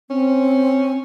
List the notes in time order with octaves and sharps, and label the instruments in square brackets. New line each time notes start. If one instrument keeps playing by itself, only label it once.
[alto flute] C4 [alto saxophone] C#4